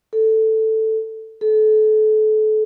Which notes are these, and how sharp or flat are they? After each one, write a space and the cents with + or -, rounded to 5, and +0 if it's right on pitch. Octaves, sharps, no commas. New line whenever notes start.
A4 +5
A4 -30